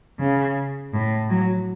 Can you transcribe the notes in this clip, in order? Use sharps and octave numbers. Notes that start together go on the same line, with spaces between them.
C#3
A2
F#3